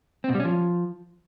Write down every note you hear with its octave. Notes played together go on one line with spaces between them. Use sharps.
C4
B2
G3
C#4
F3